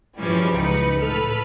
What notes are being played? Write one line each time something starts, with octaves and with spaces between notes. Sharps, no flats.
G2 E3 F3 G3 G#3 C#4
C#2 D#4 B4 C#7
A2 A4 B4 F6